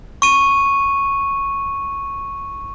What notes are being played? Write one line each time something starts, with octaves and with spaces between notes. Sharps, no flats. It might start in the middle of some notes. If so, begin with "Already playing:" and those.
C#6 D#7